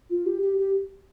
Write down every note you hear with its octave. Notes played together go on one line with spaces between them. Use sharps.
F4
G4
G4
G4